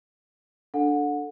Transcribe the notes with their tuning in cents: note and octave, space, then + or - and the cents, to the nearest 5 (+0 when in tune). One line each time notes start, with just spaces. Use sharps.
D4 +0 A4 +0 F#5 -30